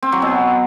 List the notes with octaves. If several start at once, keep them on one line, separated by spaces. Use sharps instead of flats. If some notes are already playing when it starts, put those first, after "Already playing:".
C4
F#3
B2